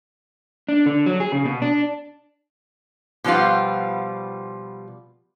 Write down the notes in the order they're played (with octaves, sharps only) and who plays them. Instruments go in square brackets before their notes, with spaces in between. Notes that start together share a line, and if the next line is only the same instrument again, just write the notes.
[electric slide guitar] D4
D3
F#3
G#4
C#3
B2
D4
[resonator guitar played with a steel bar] B2 F3 G3 B3 F4